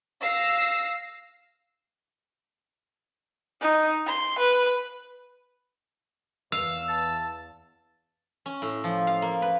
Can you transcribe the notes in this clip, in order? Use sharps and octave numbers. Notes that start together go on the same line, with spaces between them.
F5 E6 A#6 C7
D#4
C6
B4
E2 F5 E6
A5
C#4
A2
F3
F5
A#3
B4